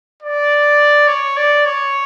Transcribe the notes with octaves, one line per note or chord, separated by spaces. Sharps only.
D5
C#5
D5
C#5